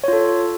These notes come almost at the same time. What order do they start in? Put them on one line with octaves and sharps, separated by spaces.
C#5 F4 A4